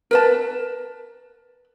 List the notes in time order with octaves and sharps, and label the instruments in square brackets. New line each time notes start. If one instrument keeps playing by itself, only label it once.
[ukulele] A#4 B4 A5